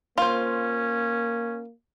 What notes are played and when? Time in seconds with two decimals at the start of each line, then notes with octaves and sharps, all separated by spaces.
0.18 A#3 C#4 F4 C5